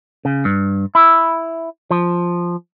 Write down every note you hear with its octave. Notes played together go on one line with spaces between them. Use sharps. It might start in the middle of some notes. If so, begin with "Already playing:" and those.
C#3
G2
E4
F3